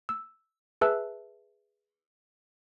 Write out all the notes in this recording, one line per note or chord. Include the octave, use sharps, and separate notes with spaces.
E6
G#4 B4 E5 A5 E6 F#6